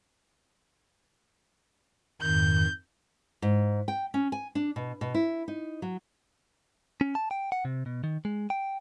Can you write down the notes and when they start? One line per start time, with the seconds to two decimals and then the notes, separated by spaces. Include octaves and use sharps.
2.22 F2 G#2 D#3 G6
3.42 G#2
3.88 G5
4.14 C#4
4.32 G#5
4.55 D4
4.76 B2
5.01 B2
5.14 E4
5.48 D#4
5.82 F#3
7.01 C#4
7.15 A5
7.31 G5
7.52 F#5
7.65 C3
7.86 B2
8.04 D#3
8.25 G#3
8.50 G5